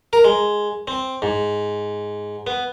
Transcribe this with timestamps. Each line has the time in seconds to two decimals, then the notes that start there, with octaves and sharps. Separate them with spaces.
0.13 A#4
0.24 G#3
0.88 C4
1.22 G#2
2.47 B3